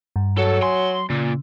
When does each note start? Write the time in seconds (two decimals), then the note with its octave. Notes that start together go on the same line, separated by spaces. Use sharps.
0.16 G2
0.38 F#3 A4
0.62 G#5 C6
1.10 A#2 C#3